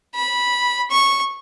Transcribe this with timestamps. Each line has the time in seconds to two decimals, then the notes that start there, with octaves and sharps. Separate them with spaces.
0.15 B5
0.91 C#6